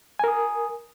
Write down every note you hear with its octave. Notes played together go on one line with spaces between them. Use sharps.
A#4 G#5 D#6